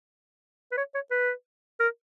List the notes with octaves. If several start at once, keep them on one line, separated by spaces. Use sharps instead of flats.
B4
C#5
C#5
B4
A#4